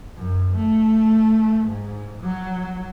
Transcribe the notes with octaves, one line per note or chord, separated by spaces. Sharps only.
F#2
A3
G#2
F#3